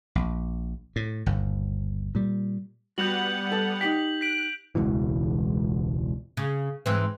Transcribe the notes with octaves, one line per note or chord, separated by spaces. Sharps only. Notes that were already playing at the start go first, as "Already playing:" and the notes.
A#1
A2
G1 D#2
A#2 G3
G3 B3 F#4 F#5 G6 F7 F#7
A4
D#4 G4 G5 B6 F#7
F#6 B6 D7
E1 C#2 B2 E3
C#3
G#2 E3 C4